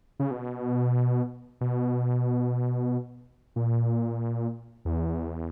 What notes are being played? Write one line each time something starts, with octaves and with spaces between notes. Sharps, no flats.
C#3
B2
B2
A#2
E2